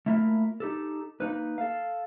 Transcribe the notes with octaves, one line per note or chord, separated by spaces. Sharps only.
A3 A#3 E4 F4 A4 A#4
D#4 G4 A4
A#3 D#4 B4
A4 F5